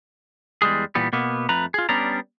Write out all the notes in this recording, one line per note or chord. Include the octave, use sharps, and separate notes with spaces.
E2 G3 G#3 G#4
A#2 E3 G3 B3
B2 A#3 B3
F2 A3 B4 A#5
F4 G#4
G3 B3 C#4 D4 D5 A#5